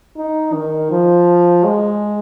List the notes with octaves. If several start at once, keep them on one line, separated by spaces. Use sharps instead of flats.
D#4
D#3
F3
G#3